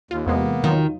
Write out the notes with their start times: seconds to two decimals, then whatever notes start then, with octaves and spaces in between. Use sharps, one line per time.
0.11 D#2 F4
0.26 E2 C3 G#3 A#3 B3
0.64 D#3 F#3 D#4 F4